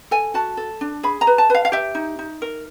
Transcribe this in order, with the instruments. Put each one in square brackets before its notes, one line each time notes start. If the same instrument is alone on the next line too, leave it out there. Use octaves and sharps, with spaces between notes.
[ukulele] A4 G#5
F#4 A5
A4
D4
G#4 B5
A#5
B4
A5
B4 F5
F5
G4 E5
D#4
D#4
A#4